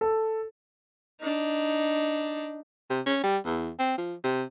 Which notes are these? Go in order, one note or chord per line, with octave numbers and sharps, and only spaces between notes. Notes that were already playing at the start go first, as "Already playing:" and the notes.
A4
D4 D#4
C3
C#4
G3
E2
C4
F3
C3